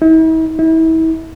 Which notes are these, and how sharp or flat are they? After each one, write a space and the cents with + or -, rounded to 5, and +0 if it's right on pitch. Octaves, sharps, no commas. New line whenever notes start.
E4 -45
E4 -35